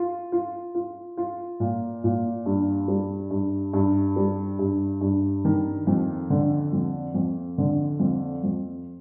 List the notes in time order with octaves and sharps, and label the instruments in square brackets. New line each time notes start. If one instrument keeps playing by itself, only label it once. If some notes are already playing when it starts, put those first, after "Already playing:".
Already playing: [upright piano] F4
F4
F4
F4
A#2
A#2
G2
G3
G2
G2
G3
G2
G2
D#3
F2
D3
F2
F2
D3
F2
F2